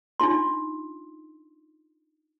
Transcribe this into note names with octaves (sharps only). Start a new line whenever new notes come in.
D4 D#4 F4 C6